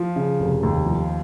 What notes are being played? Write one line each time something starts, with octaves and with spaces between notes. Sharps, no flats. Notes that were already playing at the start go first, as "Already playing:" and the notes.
Already playing: F3
C#3
F1
D#2
F3